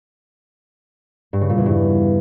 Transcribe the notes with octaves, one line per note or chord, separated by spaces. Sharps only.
G2
C#3
A#2
E2
G2